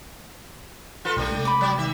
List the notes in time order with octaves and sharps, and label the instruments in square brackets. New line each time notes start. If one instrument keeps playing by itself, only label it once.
[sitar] F4 A4 B4
[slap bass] B1 [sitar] G3 A3 D4
[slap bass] C3 G#3
[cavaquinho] B5 D6
[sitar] F#3 D5
D#3 E5